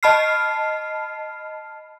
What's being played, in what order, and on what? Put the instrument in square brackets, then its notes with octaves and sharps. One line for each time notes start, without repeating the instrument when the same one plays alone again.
[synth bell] D#5 A5 B5 F6 C7